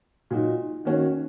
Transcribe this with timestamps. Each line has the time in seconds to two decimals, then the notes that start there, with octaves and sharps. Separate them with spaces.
0.30 A#2 F#3 D#4 F#4
0.85 D#3 A#3 C#4 F#4